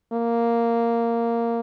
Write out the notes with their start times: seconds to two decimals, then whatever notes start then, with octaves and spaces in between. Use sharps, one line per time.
0.13 A#3